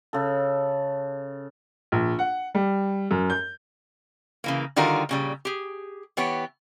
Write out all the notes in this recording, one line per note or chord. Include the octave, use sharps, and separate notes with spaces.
C#3 A4
A#1
F#5
G3
F#2
G6
C#3 E3 A#3
D3 D#3 G3 F4 F#4 A#4
A#2 C#3 G3
G4 G#4
E3 B3 G4 C#5